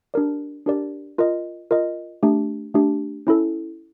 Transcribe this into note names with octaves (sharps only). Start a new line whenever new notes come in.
D4 G4 A#4 D5
D4 G4 A#4 D5
F4 A#4 D#5
F4 A#4 D#5
A3 D4 G4
A3 D4 G4
C#4 E4 A4